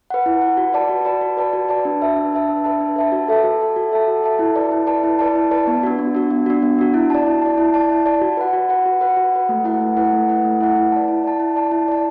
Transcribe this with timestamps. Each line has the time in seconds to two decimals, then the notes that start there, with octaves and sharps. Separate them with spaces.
0.10 B4 F#5
0.26 E4
0.42 B4 F#5
0.57 F#4
0.73 B4 D5 A5
0.89 F#4
1.05 B4 D5 A5
1.21 F#4
1.37 B4 D5 A5
1.53 F#4
1.69 B4 D5 A5
1.85 D4
2.01 B4 E5 A5
2.17 D4
2.33 B4 E5 A5
2.49 D4
2.64 B4 E5 A5
2.80 D4
2.96 B4 E5 A5
3.12 F#4
3.28 A4 E5 A5
3.44 F#4
3.60 A4 E5 A5
3.76 F#4
3.92 A4 E5 A5
4.08 F#4
4.23 A4 E5 A5
4.39 E4
4.56 B4 D5 A5
4.71 E4
4.87 B4 D5 A5
5.04 E4
5.19 B4 D5 A5
5.35 E4
5.51 B4 D5 A5
5.67 B3
5.83 D4 F#4
5.99 B3
6.15 D4 F#4
6.31 B3
6.46 D4 F#4
6.62 B3
6.79 D4 F#4
6.94 E4
7.10 D5 A5
7.26 E4
7.42 D5 A5
7.58 E4
7.74 D5 A5
7.90 E4
8.06 D5 A5
8.21 F#4
8.37 B4 F#5
8.53 F#4
8.69 B4 F#5
8.86 F#4
9.01 B4 F#5
9.17 F#4
9.33 B4 F#5
9.49 A3
9.64 E4 B4 F#5
9.81 A3
9.97 E4 B4 F#5
10.13 A3
10.29 E4 B4 F#5
10.45 A3
10.61 E4 B4 F#5
10.76 E4
10.92 D5 A5
11.08 E4
11.24 D5 A5
11.40 E4
11.56 D5 A5
11.72 E4
11.88 D5 A5